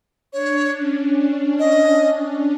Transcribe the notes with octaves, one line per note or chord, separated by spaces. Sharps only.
D4 C#5
C#4
D4
D#5